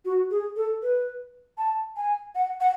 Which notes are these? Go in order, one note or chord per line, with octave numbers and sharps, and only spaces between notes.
F#4
G#4
A4
B4
A5
G#5
F#5
F#5